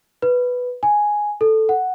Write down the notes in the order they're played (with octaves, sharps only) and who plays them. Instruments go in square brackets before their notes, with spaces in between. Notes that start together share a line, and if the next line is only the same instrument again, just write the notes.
[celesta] B4
G#5
A4
F#5